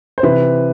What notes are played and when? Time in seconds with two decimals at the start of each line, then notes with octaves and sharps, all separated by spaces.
0.18 C5
0.23 C3 E3 B4